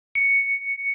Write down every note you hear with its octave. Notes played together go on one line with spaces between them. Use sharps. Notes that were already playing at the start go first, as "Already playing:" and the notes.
C#7